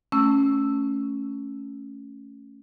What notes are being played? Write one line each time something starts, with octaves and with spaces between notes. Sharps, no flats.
A3 C#4 E6